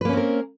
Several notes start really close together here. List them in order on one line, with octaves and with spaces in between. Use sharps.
B4 A#3 C#4 C4 A#4